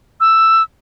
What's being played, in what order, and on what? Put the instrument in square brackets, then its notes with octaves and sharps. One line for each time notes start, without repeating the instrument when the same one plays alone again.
[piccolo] E6